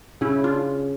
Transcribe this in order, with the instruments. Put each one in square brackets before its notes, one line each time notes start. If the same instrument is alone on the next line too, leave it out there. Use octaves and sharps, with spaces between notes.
[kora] C#3 [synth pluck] C#4 E4
[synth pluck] D4 F4